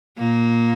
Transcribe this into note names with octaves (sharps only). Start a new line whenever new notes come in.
A#2 A#3